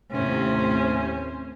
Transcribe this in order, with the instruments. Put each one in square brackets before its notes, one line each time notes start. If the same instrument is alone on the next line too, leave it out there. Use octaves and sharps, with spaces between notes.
[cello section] D#2 A2 C3 [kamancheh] C#4 [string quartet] C5